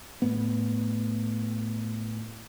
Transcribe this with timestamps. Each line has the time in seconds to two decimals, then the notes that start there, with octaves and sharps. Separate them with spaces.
0.22 A2 B3